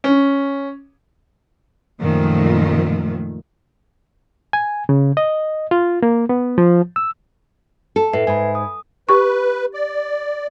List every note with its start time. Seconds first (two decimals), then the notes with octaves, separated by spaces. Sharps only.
0.04 C#4
2.00 F#2 A#2 D#3 F3 A3
4.53 G#5
4.89 C#3
5.17 D#5
5.71 F4
6.03 A#3
6.29 B3
6.58 F3
6.96 E6
7.96 A4
8.13 A2 B4 E5 C7
8.27 G#2 G#5 B5
8.55 D#6
9.09 G4 B4 C#6
9.74 D5